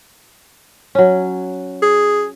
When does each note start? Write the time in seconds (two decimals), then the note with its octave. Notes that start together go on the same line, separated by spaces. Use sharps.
0.95 F#3 C#4
1.82 G#4